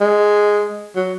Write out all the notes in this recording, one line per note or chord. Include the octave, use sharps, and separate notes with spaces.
G#3
F#3